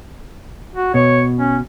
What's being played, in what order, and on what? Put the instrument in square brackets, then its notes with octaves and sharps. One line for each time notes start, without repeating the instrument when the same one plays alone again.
[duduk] F#4
[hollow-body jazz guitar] B2 [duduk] C#5
[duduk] C#4